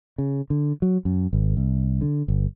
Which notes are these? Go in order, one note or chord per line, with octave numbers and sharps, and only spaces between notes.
C#3
D3
F#3
F#2
G#1
C2
D3
G1